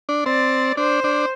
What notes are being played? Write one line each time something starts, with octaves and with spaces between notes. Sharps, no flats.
D4
C4 D5
D4 C5
D4